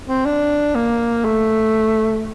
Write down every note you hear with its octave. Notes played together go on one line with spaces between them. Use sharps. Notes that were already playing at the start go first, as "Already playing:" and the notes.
C4
D4
A#3
A3